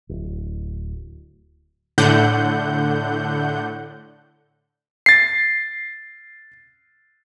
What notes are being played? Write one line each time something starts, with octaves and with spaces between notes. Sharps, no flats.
D1
A2 D3 F#5 G6
A6 C7